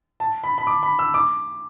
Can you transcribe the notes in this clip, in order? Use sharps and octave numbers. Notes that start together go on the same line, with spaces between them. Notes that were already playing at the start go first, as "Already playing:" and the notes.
A5
B5
B5
D6
B5
E6
D6